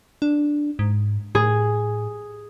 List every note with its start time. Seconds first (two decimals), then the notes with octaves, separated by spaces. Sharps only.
0.22 D4
0.79 G#2
1.35 A2 G#4